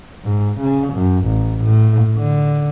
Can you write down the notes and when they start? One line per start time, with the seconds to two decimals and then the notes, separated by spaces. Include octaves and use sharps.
0.24 G#2
0.60 C#3
0.94 F#2
1.26 A1
1.64 A2
2.17 D3